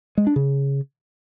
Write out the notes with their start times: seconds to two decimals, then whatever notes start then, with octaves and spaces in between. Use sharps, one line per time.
0.18 G#3
0.27 D4
0.36 C#3